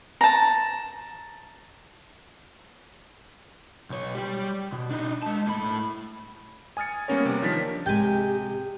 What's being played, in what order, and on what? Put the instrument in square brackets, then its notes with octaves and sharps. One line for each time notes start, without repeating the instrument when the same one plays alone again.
[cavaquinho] A5 A#5
[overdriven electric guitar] B1 C#5
G3 G4
B2
D4 D#4
G#3 A5
A2 B5
[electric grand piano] G#5 D#6 F6 A6 C#7
G3 A#3 B3 C#4 A#4 C#5
C3 G3
D#3 F3 D4 A#4 A6 B6
[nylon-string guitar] C3 G#3 [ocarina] G4 [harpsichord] G5 G#5